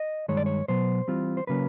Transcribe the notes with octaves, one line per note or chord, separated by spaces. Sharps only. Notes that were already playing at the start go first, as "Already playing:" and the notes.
Already playing: D#5
G2 D#3 G#3 C#5
D5
C#5
B2 F#3 B3 C5
E3 G3 C4 F4
C5
C#3 F#3 A#3 C#4 B4